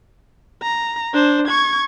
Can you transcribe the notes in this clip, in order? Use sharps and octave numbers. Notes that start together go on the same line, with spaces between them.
A#5
D4 C5
C#6 G#6